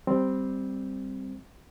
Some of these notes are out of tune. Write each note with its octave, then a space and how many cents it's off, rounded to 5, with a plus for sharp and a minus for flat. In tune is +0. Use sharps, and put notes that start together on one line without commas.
G3 +0 C4 +0